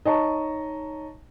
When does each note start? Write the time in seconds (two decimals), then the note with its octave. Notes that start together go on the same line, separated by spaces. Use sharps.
0.06 D#4 C#5 D#5 A5 A#5 C#6